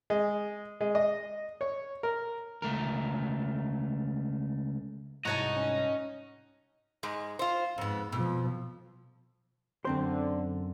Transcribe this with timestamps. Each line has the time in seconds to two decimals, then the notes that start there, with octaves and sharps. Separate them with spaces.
0.10 G#3
0.81 G#3
0.95 D#5
1.61 C#5
2.03 A#4
2.62 C#2 A3 A#4
5.25 C2 G#2 E4 F#4 C#5 D#5 A5 A#5
5.56 C#4
7.03 G#2 G#3
7.39 F4 C5
7.78 F2 G#2 B3
8.12 F2 B2 F3
9.85 F#2 D3 C4 C5